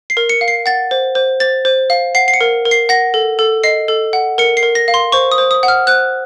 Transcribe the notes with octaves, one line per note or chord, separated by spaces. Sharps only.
C7
A#4
C#7
F5
C7
F#5 A6
C5
C5
C5 A6
C5
F5
F#5 C7
C7
C#7
A#4
A#4
C7
F#5 A#6
A4
A4
D#5 C7
A4
F#5
A#4 C#7
C7
A#4
A#6
F5
C6
C5 C#6
D#6
C5
D#6
F#5
F6
C5 F#6